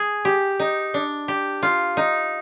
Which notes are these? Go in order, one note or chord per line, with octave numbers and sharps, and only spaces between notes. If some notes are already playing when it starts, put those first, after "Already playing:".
Already playing: G#4
G4
D#4
D4
G4
F4
D#4